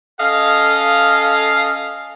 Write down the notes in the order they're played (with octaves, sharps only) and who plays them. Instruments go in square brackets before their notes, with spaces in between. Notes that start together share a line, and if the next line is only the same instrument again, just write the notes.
[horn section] C#4 A4 D#5 F5